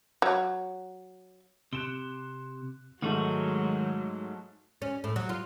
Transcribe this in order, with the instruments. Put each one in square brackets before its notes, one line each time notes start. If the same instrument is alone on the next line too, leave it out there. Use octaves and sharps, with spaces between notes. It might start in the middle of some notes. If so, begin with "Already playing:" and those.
[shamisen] F#3
[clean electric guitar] C3 [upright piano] F#6 E7 G7
[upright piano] G#2 A3 [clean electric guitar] D#3 D#4 F#4 [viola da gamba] F#3 G#3
[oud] C#4
A2
F#3
F4